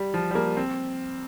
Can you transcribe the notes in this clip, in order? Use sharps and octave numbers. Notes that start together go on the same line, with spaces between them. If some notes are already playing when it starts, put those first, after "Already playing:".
Already playing: G3
F3
G3
A#3
C4